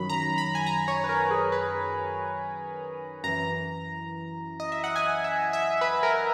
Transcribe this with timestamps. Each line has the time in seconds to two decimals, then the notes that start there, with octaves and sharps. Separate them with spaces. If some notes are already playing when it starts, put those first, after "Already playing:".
Already playing: F#2 D#3 F#3 B5
0.10 A#5
0.38 B5
0.55 G#5
0.66 A#5
0.88 C#5
1.04 B4
1.09 A#4
1.31 G#4
1.52 B4
3.24 F#2 E3 A#5
4.60 D#5
4.72 E5
4.84 F#5
4.96 G#5
5.24 E5
5.53 E5
5.81 B4
6.03 A#4